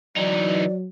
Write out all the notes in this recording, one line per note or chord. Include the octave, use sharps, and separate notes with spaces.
E3 F#3 D#4 D5